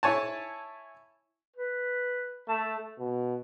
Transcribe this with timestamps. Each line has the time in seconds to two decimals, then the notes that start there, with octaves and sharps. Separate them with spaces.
0.03 E4 C#5 G#5 A5
1.56 B4
2.48 A3 A5
2.99 B2